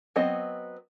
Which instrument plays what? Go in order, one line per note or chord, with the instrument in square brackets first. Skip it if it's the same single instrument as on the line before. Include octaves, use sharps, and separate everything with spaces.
[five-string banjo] F#3 B3 C4 D#5